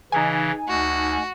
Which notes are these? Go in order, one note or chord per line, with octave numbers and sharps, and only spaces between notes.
C#3 E3 D#4 G#5
D2 F#4